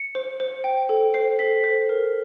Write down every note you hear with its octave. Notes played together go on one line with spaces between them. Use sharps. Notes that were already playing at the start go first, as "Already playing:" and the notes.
Already playing: C#7
C5
C5
G5
A4
C5 C7
A4 B6
C5
A#4